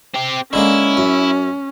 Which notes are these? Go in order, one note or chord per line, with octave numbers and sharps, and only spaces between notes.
C4 G4
D3 G#3 A#3 C#4 E4
F#2